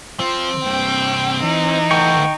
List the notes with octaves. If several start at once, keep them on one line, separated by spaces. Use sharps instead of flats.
F3 C4
G2 C3 G5
E3 D#4
A3 B3 G5 C#6